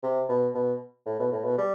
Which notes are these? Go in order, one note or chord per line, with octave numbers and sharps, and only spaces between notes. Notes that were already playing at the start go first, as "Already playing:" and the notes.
C3
B2
B2
A2
B2
A2
B2
G3